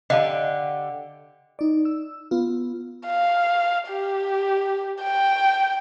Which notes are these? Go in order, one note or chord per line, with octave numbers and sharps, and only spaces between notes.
D3 G4 D#5 F5 A5
D#4 D5
E6
B3 F4
F5
G4
G5